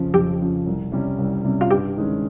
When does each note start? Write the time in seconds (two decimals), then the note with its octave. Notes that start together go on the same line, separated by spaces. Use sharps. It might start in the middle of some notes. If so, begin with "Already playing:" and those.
Already playing: F2 C#3 F3
0.13 F2 G4
0.41 C#3 F3
0.67 C2
0.92 C3 G3 C#4
1.18 C2
1.44 C3 G3 C#4
1.61 F4
1.70 G2 G4
1.97 D#3 G#3 C#4